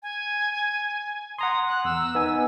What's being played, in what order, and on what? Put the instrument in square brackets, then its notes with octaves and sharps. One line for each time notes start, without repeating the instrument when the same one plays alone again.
[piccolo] G#5
[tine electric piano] F#5 A#5 C6 [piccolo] D#6
[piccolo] F#6
[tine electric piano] E2 [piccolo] E6
[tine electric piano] B3 D#4 G#5